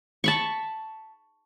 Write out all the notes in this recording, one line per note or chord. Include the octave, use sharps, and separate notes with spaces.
A5 B5 C#6